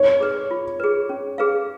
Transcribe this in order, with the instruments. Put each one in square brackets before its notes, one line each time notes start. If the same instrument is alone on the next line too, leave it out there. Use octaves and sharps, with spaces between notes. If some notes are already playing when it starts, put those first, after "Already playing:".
Already playing: [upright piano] C#5
[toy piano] G#4 B4
F4
G#4 B4
C#4
G#4 B4 F5